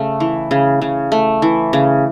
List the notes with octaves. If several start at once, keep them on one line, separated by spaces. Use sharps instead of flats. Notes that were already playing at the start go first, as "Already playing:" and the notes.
Already playing: C#3 A3
E3
C#3
C#3
A3
E3
C#3